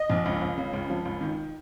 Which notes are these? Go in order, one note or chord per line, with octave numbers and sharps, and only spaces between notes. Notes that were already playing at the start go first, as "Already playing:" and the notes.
Already playing: D#5
A#1
C#2
C#2
C#3
C#2
F3
C#2
D#3